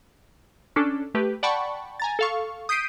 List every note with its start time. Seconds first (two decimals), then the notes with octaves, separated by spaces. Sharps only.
0.76 C#4 D4 A4
1.14 A3 G4 B4
1.43 D5 F#5 G5 A5 B5 C#6
2.00 G#5 A#5 A6
2.19 A4 F5 C#6
2.69 D#6 G6 B6 C7 D7 D#7